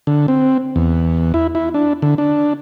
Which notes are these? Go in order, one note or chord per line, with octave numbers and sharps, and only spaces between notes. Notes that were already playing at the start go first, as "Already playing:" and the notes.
D3
C4
E2
E4
E4
D4
D3
D4